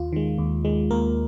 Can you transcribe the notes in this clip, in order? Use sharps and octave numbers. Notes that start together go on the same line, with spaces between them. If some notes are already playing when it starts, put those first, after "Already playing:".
Already playing: D#2 F4
D#3 G#3
D#2
D#3 G#3
D#2 A#3 A#4